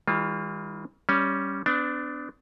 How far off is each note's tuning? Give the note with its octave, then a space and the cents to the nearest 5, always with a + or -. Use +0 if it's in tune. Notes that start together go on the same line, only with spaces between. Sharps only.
E3 -45 G3 +45 F4 +0
G3 +0 C#4 +0
B3 +40 D4 +0